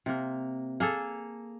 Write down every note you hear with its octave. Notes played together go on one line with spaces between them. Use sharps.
C3 A#3
A#3 G#4 A4